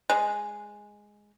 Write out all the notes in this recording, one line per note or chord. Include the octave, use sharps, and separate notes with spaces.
G#3